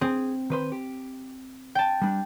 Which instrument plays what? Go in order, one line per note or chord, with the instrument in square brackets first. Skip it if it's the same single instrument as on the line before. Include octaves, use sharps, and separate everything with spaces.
[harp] C4 [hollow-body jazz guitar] G#4
[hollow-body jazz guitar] D#3 B4 C5
G4
[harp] G5 A5
[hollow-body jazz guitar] G3 D4